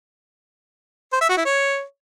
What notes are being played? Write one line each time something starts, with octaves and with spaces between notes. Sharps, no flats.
C5
E5
F#4
E4
C#5